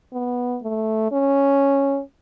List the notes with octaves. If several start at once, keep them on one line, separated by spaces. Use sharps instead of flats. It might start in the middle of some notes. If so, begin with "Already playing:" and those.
B3
A3
C#4